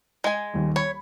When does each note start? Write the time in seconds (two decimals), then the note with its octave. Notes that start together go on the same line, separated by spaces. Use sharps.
0.24 G#3 G#5
0.54 D#1 D#2
0.76 C#5 B5